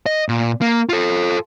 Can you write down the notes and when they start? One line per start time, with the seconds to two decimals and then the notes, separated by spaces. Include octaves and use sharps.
0.06 D#5
0.29 A#2
0.62 A#3
0.89 F4 A4